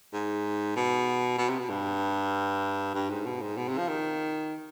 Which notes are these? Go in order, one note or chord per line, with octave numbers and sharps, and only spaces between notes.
G#2
B2
B2
C3
B2
G2
G2
G#2
B2
G#2
B2
C3
F3
D#3